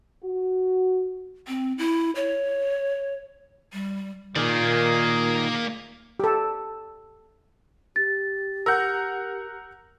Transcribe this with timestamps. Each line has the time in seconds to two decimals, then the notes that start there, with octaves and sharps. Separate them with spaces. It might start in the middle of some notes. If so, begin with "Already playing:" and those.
0.23 F#4
1.48 C4
1.78 E4
2.16 C#5
3.73 G3
4.36 A#2 D#3 A#3 G#4 D5
6.20 G4 A4
7.96 G4 A6
8.66 A#4 F#5 E6 G6